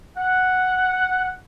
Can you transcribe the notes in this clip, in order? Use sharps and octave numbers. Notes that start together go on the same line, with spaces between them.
F#5